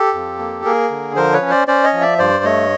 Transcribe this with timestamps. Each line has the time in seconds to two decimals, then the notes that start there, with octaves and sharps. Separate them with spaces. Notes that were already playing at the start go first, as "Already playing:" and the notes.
Already playing: G4 A4
0.14 F2
0.39 A#3
0.65 A#3 G#4 A#4
0.91 D3
1.16 F3 A#4 C5
1.33 B4 C#5
1.42 C#4
1.50 C5 D5
1.68 C#4 C5 D5
1.84 C#5 D#5
1.93 F3
2.01 D5 E5
2.18 G2 C5 D5
2.44 A3 C#5 D#5